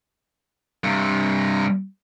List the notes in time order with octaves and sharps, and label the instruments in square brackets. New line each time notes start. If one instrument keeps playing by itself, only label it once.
[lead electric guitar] G2 C3